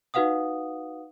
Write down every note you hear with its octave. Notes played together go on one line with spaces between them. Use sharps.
D#4 F#4 B4 F5 F#5 D#6